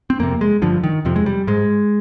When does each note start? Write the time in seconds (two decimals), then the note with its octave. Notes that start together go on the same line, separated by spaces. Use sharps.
0.10 C4
0.19 F2 C3 A#3
0.41 G#3
0.62 G2 D3 F3
0.84 D#3
1.05 F2 C3 F3
1.16 G#3
1.26 G3
1.47 G#2 G#3